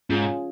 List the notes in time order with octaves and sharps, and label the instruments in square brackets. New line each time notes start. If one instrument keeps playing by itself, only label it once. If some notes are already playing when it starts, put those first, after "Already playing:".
[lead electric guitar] G#2 [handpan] C#4 F4 G#4